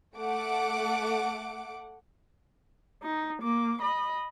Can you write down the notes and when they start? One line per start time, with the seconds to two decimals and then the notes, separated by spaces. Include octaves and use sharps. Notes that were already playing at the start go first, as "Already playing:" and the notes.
0.17 A3 F#5 D6 D7
3.03 D#4
3.42 A#3 D6
3.82 D#5 B5